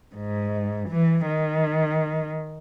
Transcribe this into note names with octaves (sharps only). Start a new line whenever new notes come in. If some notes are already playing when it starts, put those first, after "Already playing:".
G#2
E3
D#3